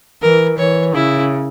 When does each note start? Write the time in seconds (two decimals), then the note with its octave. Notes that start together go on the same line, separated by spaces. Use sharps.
0.22 E3 A#4
0.58 E3 C#5
0.95 C#3 E4